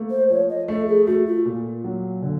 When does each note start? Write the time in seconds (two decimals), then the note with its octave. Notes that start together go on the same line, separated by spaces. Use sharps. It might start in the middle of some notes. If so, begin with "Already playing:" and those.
Already playing: A3 A#3
0.10 C5
0.30 F3 C#5
0.49 D#5
0.68 A3 A4
0.88 G#4
1.07 A3 F#4
1.27 F4
1.45 A#2
1.84 F#3
2.22 D3